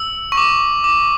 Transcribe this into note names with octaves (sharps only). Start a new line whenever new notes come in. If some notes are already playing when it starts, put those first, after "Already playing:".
Already playing: E6
C#6
D6
D6